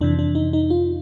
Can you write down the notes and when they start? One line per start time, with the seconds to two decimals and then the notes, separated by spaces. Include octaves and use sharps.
0.01 F2 C3 E3 D4
0.19 D4
0.35 D#4
0.53 D#4
0.70 F4